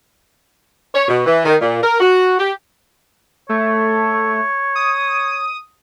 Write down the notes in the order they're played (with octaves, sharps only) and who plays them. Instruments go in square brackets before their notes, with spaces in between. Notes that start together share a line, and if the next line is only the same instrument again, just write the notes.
[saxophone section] C#5
B2
E3
D#3
A#2
A#4
F#4
G4
[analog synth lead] A3 [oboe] C#5
[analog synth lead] D#6